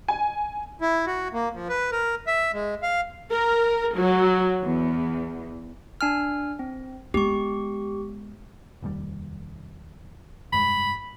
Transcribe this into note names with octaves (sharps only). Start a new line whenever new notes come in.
G#5
E4
F#4
A#3
F3
B4
A#4
E5
G#3
F5
A#4
F#3
E2
D4 G#5 F6
C4
G#3 B3 G4 C#6
F1 D#2 G3
F1 G2 G#3 B5